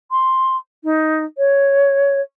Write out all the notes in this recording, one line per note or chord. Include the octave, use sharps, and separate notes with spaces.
C6
D#4
C#5